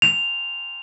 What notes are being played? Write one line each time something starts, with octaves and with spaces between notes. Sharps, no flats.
F7